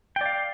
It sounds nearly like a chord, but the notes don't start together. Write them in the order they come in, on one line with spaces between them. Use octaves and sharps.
G5 D5 F5